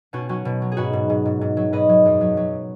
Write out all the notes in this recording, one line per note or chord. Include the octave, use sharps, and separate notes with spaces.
B2 C#4 F#4
F#3 C#4 F#4
B2
F#3
G#4
G#2 F#4 B4
G#2
G#2
G#2
G#2
F#3
G#2 B4 D#5
F#3
F#2
F#3
F#3